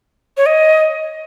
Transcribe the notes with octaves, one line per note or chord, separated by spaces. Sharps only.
C#5
D#5